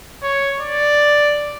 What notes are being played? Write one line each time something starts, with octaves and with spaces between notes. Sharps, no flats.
C#5
D5